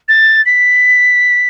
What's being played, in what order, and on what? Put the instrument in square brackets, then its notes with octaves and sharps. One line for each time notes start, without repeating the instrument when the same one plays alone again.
[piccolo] A6
B6